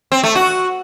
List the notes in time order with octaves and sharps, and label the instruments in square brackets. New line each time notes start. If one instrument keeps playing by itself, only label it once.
[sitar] C4
A3
F#4